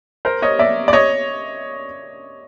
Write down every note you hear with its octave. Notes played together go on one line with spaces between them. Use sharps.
A#4 C5
C#5 D#5
D5 E5
D5
C#5 D#5